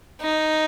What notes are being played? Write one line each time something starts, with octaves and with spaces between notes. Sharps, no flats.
D#4